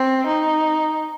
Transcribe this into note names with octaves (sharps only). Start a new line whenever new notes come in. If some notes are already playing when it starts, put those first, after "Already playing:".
Already playing: C4
D#4